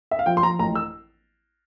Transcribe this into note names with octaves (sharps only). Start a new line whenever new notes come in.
E5
F5
F3 G5
C6
F3 A#5
A1 A#5
E6